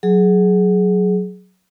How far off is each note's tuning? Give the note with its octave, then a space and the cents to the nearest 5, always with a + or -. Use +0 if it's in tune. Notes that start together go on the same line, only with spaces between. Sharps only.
F#3 +0 G#4 +15